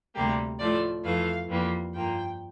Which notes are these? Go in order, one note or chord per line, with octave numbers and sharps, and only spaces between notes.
D2 C3 G3 A#3 G4
A2 F3 A3 D5
F2 E3 A3 F5
F2 E3 G3 A#3
G2 F3 A#3 G5